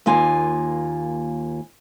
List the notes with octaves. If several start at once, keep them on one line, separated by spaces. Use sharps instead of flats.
D#2 A#3 F4 G#5